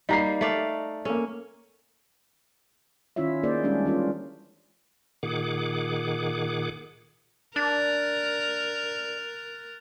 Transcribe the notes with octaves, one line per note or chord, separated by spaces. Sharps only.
G3 A#3 D#4 A#5 C7
A3 D5 F5
A#3 C#4 A4
D#3 C#4 E4 F4 C#5 E5
A#3 D#4 G#4 C5 D5
G3 G#3 C#4 D4 G4
E3 C#4 F4 A#4
A#2 D#3 G#4 F#5 D6
D4 A#4 F#6 A6